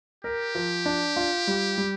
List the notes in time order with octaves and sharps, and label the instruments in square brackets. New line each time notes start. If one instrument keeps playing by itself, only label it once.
[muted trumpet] G4 [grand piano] A#4
[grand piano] F3
D4
F4
G3
G3